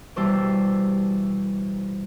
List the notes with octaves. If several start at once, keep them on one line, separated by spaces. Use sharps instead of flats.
B2 E3 G3 C5 A5 E6